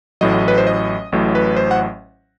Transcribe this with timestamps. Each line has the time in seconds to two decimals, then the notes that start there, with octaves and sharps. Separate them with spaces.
0.21 A1 A2 F#3 D#5
0.48 B4
0.58 C5
0.67 D#5
1.12 A1 A2 F#3
1.35 B4
1.57 C5
1.71 F#5